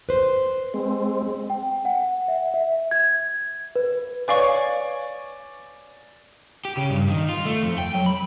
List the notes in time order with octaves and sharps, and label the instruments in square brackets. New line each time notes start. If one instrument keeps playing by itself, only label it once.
[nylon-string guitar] B4 C5
[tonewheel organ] G#3 C4
[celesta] G5
F#5
E5
E5
G#6
B4
[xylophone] B4 F5 C#6 [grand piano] C#5 D5 G#5
[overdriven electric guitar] G4
C#3
G2
D#3
F4
A3
F2
G5
F#3
B5